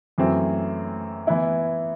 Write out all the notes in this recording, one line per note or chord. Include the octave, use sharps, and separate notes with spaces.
F#2 E3 A3 C4
E3 B3 E4